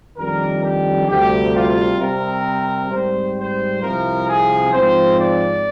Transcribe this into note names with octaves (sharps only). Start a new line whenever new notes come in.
F2 D#3 G3 D4 A#4
G4
D2 C3 G3 G4
F4
C3 G3 C4 A#4
G#2 G3 C4 C5
C5
C2 C3 F3 A#4
G#4
G#2 F3 C4 C5
D5